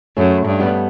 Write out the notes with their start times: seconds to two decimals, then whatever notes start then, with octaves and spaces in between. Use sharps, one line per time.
0.17 F#2 A3 C#4
0.46 G2
0.60 G3 B3